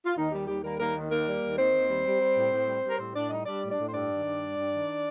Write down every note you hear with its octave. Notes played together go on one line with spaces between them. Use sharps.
F4
D#2 D#3 D#4
D#3 G3 G4
D#2 G3 G4
G3 A#3 A#4
D#2 A#3 A#4
D#3
D#2 A#3 A#4
G3
D#2
D#3 C4 C5
D#2
G3
G3
G3
A2
A2
G3
G3
A#4
A2 C4 C5
A2 D4 D5
G3 D#4 D#5
G3 D4 D5
A2
D4 D5
A2
C5
G2 D4 D5
D#3
G2
G3
G2
D#3